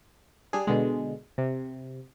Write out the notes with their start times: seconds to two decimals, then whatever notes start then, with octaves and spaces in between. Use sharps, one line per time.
0.53 G3 D4 G#4
0.67 B2 D3 G#3
1.38 C3